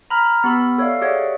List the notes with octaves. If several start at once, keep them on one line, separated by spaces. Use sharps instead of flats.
A#5 B5 F6
B3 G4 B5 E6
A4 C#5 D5 E5 F5
G4 G#4 C#5 D5 E5 F#5